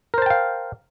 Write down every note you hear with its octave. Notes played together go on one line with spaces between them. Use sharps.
A#4 C5 F5 G5 A5